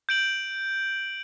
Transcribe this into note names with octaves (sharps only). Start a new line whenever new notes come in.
G6 D7 F#7